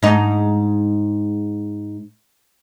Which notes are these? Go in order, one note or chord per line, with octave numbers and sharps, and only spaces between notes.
G#2 D#4